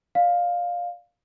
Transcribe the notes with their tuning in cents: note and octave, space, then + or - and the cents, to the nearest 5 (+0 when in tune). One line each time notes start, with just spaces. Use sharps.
D5 +0 F5 +10